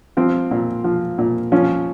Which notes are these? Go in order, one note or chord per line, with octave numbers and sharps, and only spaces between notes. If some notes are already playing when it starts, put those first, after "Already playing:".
F3 C4
A#2
F3
A#2
F3 C#4